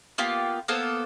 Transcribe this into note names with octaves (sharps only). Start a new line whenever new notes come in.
A#3 B3 F4 G4
A#3 B3 A4 C5